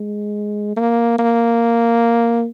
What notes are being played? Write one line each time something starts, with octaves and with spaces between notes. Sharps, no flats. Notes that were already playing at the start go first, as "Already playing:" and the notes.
Already playing: G#3
A#3
A#3